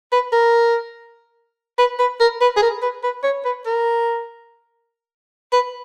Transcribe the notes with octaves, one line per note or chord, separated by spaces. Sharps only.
B4
A#4
B4
B4
A#4
B4
G#4
A#4
B4
B4
C#5
B4
A#4
B4